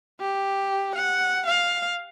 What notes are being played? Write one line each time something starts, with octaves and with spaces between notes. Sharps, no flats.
G4
F#5
F5